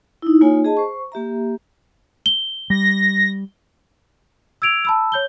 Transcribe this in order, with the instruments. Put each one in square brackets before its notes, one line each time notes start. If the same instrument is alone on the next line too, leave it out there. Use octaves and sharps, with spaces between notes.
[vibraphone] D#4 E4
A#3 D#4 F4 C#5 G#5
G#4 D#5 A5
C5 C#6
A#3 G4 E5 A#5
[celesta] G7
[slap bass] G3 [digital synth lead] A#6
[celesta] E6 G#6 D7 F7
A5 B5 E6
C#5 G6 G7